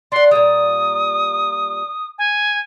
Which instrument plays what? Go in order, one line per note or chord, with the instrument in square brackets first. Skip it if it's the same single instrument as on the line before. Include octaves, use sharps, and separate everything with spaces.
[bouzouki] D4 F#5 [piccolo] C6
[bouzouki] A#2 G3 [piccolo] D#6
[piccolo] G#5